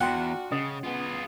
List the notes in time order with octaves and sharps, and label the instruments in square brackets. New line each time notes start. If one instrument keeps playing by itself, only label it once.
[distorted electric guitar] E2 [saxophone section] D4 F4 F#4 [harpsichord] F#5 [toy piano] G5 C6
[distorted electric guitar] C#3 [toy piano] C#4 D#5 D#6
[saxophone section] B3 [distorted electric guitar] F4 G#4